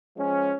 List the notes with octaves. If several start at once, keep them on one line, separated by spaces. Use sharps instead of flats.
F3 G#3 C#4